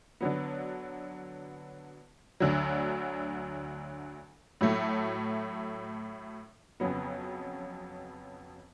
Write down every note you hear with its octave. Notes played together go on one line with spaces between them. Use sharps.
D3 F#3 B3
D2 D3 F#3
A2 F#3 A3
F2 C#3 F#3 B3